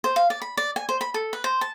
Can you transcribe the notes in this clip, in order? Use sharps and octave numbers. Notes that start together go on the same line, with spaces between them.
C5
F5
D5
B5
D5
G#5
C5
B5
A4
B4
C5
A5